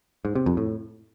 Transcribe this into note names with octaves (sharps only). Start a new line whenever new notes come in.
G#2
C3
F2
A2